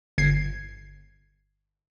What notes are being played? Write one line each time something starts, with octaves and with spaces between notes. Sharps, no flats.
G1 G#6 C7